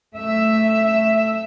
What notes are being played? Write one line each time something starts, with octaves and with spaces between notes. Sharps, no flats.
A3 E5